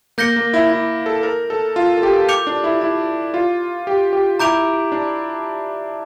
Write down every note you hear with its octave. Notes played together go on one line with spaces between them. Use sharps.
A#3 G6 A#6 C#7 G7
A#3
E4
E4
A4
A#4
A4
F4
A4
G4
D6 G6 C#7 F7
D4
E4
E4
F4
G4
G4
E4 A#5 D6 G6 D7 F7
D4